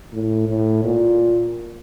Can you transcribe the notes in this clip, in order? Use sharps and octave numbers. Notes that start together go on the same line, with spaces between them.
A2
A2
A#2